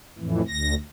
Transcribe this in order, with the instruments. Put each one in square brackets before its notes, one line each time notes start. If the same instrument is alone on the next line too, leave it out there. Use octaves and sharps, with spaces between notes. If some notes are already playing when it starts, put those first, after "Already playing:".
[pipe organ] F2 A2 E3
D2 A#6